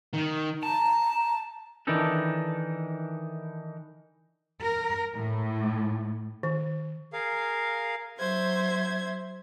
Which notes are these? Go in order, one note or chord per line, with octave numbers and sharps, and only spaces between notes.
D#3
A5 A#5
D#3 E3 D4 D#4 A4
A#4
A2
D#3
G#4 A#4 F5
F#3 C5 E5 G#6